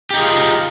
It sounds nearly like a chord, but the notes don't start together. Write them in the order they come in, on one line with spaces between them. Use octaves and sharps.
G4 D#4 G#4 F4